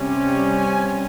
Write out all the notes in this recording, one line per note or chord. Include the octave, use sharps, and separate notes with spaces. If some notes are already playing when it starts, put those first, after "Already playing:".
Already playing: C3 G3 C#4
G#5